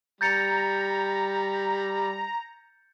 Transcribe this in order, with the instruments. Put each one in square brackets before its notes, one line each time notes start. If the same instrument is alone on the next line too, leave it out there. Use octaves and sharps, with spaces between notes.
[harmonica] G3 [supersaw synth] A#5 [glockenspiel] G6 A6 C#7